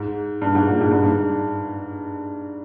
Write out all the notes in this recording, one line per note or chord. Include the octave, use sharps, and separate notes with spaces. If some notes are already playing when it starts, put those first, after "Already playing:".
Already playing: G#2
G2
G#2
A#2
G#2
G2
G#2